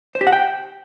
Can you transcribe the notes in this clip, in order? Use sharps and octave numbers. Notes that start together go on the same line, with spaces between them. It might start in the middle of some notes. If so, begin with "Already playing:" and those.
C5
G4
F#5
G5